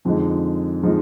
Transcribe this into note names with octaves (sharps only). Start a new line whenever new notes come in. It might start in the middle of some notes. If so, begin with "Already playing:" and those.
F2 D3 F3 G#3 D#4
D3 F3 G#3 D#4